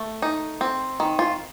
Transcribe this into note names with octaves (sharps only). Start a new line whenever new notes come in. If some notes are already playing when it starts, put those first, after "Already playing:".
Already playing: A3
D#4
C4
D#3
F4